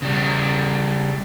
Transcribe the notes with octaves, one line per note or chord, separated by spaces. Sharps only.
C#3 G3